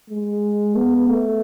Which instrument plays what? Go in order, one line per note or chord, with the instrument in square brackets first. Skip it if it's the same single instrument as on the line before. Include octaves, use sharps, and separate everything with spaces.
[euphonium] G#3
B3
A3